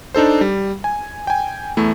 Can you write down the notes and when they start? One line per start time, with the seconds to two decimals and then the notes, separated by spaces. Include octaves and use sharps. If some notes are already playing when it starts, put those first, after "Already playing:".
0.14 D4 D#4 A4 C5
0.41 G3
0.84 G#5
1.27 G5 G#5
1.77 E2 A3 E4